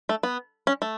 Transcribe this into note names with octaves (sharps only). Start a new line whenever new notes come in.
A3
B3
C#4
A3